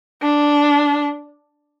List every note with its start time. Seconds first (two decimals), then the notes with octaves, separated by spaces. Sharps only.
0.22 D4